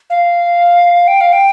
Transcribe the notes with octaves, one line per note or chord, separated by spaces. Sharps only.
F5
G5
F5
G5